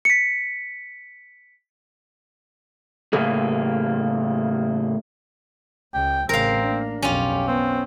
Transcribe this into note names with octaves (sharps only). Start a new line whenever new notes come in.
B6 C#7
A2 C#3 A#3 G#4
C#2 G5
A1 C#3 C4 A#4 F5
A#3 D4
B1 F2 C#4 F4 G4
B3 C4